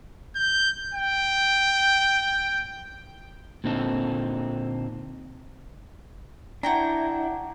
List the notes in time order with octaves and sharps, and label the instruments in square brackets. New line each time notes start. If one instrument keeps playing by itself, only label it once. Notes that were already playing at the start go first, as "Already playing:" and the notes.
[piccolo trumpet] G6
G5
[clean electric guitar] A#2 D3 C4 D#4 A4
[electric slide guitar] D4 E4 [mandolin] F#4 G5 A#5